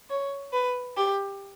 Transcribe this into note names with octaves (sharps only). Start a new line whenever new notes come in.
C#5
B4
G4